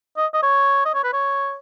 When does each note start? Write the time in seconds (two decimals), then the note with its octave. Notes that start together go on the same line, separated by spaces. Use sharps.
0.17 D#5
0.34 D#5
0.43 C#5
0.85 D#5
0.94 C#5
1.04 B4
1.13 C#5